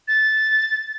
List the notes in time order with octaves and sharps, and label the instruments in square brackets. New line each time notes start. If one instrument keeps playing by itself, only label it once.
[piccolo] A6